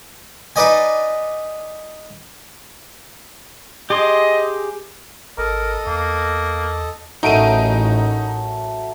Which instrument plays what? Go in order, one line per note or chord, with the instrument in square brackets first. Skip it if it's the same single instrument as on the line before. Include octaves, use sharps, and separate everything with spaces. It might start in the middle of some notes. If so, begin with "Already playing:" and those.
[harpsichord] D#4 B4 D5 D#5 G#5
[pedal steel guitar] G4 G#4 C6 [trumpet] D#5
[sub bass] G#1 [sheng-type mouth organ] A4 D#5 [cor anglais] A#4
[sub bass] E2 [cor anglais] A#3
[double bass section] A1 [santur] F#3 A3 A#4 [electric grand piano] D#4 D7 D#7